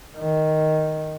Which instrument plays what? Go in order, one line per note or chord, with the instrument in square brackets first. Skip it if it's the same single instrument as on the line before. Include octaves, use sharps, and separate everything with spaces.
[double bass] D#3